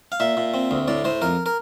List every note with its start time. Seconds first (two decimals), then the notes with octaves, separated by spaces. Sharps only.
0.12 F5
0.20 A#2 E5
0.37 A#2
0.54 C4
0.71 D2
0.88 A2 D5
1.04 A2 C5
1.22 F2 A#4
1.46 A#4